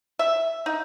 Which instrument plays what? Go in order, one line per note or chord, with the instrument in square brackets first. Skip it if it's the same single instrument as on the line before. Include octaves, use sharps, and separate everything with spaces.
[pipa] E5
D#4